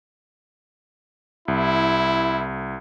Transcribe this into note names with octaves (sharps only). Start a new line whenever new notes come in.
C2 E4